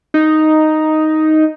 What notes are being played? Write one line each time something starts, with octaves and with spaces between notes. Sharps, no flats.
D#4